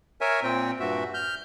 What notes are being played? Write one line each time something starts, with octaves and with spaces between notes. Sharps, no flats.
A#4 C#5 E5 G#5
A#2 C4 G5
G2 A#2 F#4 E5
F6 G6